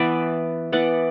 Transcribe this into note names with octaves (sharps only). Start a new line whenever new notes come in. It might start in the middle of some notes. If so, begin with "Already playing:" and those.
Already playing: E3 B3 B4 D5 E5
E3 B3 D5 F#5